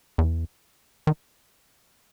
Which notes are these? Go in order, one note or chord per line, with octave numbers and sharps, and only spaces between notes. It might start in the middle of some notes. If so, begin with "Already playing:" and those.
E2
D#3